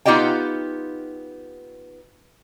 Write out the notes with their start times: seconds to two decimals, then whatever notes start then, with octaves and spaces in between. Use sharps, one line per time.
0.05 B3 D#4 F4 G4 D#5 G5